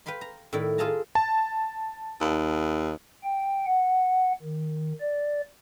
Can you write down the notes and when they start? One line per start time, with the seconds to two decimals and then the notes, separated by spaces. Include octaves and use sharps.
0.06 B4 F5 G5 B5 C6
0.21 A#5
0.53 A2 D#3 E4 D5
0.78 F4 G#4 A4 F5 A5 A#5
1.15 A5
2.21 D#2
3.23 G5
3.66 F#5
4.42 D#3
5.00 D5